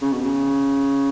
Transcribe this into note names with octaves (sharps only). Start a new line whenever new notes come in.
C#3
B2
C#3